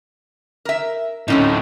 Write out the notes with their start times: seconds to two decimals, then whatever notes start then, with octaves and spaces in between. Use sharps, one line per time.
0.65 A#4 E5
1.28 D2 A2 C4 C#4 D#4